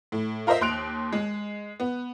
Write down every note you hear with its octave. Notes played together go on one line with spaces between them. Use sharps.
A2
F4 A#4 C5 D#5 E5
D#2 C6 F#6 D7 F7
G#3
B3